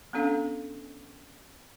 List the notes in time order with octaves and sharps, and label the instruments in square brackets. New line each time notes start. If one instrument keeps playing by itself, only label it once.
[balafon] B3 C#4 D4 A4 F5